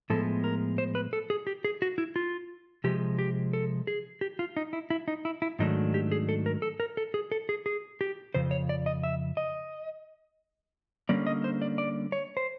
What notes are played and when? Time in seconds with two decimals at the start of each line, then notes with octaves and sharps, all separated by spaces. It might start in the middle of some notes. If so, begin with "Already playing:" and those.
0.10 A2 F3 G#3 B3 A4
0.44 A#4
0.78 C5
0.95 B4
1.13 A4
1.30 G#4
1.47 G4
1.65 G#4
1.82 F#4
1.98 E4
2.16 F4
2.84 C3 F3 G#3 G4
3.19 G4
3.53 A4
3.87 G#4
4.21 G4
4.39 F4
4.57 D#4
4.73 E4
4.90 E4
5.08 D#4
5.25 E4
5.42 E4
5.59 G#2 D#3 F#3 A3 D4 D#4
5.94 G4
6.12 G#4
6.29 A4
6.46 A#4
6.62 A4
6.80 A#4
6.97 A4
7.14 G#4
7.32 A4
7.49 G#4
7.66 G#4
8.01 G4
8.35 F2 C#3 C5
8.51 C#5
8.69 D5
8.86 D#5
9.03 E5
9.37 D#5
11.09 D3 G3 A#3 C#4 D5
11.27 D#5
11.44 C5
11.62 D5
11.78 D5
12.12 C#5
12.37 C5